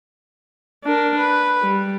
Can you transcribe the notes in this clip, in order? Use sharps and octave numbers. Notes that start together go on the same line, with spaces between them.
D4 A#4
B4
G3